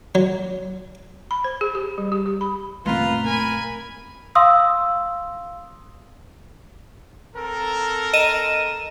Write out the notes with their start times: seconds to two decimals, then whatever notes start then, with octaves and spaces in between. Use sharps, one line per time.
0.15 F#3
1.31 B5
1.44 C5
1.61 G#4
1.75 G4
1.98 G3
2.12 G4
2.26 G4
2.41 B5
2.86 F#1 A#2 A3 C4 F4 B4 A#5 C6
3.25 A#4 G#5 B5
4.35 F5 C6 D#6 E6
7.36 C4 A4 A#4
8.13 D#5 D#7 E7